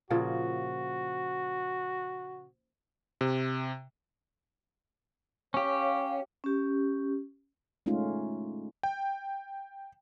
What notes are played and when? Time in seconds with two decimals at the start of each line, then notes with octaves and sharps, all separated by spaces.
0.10 A#2 C#3 F3 F#4
3.21 C3
5.54 C#4 G4 C#5 F5
6.44 C#4 G4
7.86 G#3 A3 C#4 D#4 F4
8.83 G5